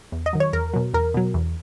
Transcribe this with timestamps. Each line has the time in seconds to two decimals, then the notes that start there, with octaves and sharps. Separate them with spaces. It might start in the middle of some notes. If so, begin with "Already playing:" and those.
0.12 E2
0.26 D#5
0.33 D#3 F#3
0.40 C#5
0.53 E2 A#4
0.73 B2 F#3
0.94 E2 A#4
1.14 B2 F#3
1.34 E2